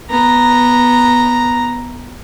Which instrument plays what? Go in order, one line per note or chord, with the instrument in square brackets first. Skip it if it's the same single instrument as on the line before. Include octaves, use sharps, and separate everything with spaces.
[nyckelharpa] B3 A#5